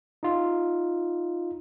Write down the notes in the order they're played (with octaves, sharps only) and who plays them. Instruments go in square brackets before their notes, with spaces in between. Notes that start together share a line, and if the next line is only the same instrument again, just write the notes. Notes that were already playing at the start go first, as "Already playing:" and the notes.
[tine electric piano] D#4 F4